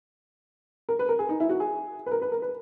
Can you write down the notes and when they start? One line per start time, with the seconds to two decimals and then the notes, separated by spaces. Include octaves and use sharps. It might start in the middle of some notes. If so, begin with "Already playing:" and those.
0.89 A#4
0.99 B4
1.09 A#4
1.19 G#4
1.29 D#4
1.40 E4
1.49 F#4
1.60 G#4
2.06 B4
2.12 A#4
2.22 B4
2.32 A#4
2.42 B4